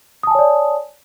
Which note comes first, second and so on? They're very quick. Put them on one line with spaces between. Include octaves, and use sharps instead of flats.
D#6 A5 G#5 C#5 D5